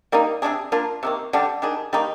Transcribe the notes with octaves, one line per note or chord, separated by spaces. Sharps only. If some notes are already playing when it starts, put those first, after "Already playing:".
G3 A#3 D#4
C3 G3 D4 G#4
A#3 D4 F4 A#4
C3 D#3 A#3
D3 G3 D4 G4
D#3 G3 D4 G#4
D#3 G3 A#3 D#4